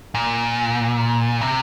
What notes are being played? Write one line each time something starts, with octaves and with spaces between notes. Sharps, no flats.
A#2
C3